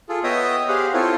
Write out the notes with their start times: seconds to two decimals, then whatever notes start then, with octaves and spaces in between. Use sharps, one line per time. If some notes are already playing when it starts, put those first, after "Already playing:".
0.09 F4 G#4 A4
0.24 B3 C#5 D#5 E5 G5 D#6
0.68 G4 G#4 C5 F5 F#5
0.94 C4 E4 F4 A4 C5 C#5